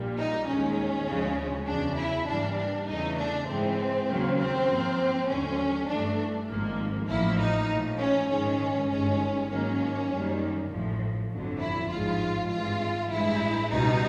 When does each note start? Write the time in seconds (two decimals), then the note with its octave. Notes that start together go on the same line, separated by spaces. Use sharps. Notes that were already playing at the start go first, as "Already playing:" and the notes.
Already playing: A#1 A#2 G3 A#3
0.17 D#4
0.47 D#2 D#3 G#3 C#4
1.07 D2 C#3 F3 G#3
1.67 E2 C#3 F#3 D4
1.97 E4
2.27 G#2 E3 G3 A#3 D4
2.57 D4
2.88 E2 C#3 E3 A3 D#4
3.17 D4
3.47 G#2 E3 G#3 C4
4.08 D#2 C#3 F#3 A#3
4.38 C4
4.68 G#2 F3 A#3
5.28 D#2 D3 F#3 A3 C#4
5.88 G2 E3 A3 D4
6.48 G#1 G#2 F3 A#3
7.08 A1 A2 F3 A#3 E4
7.39 D#4
7.69 A#1 A2 F3
7.98 C#4
8.29 G#2 D#3 G#3 C#4
8.89 G1 G2 D#3 G#3 C#4
9.49 G#2 D#3 F#3 A#3 C#4
10.09 F#2 D#3 G3 A#3
10.69 A1 A2 F3
11.30 G1 F2 D3 F#3
11.60 E4
11.90 A1 G#2 F3 G#3 F4
12.50 G#1 G2 E3 G#3 F4
13.10 A1 G2 E3 G#3 E4
13.70 C#2 B2 G3 D#4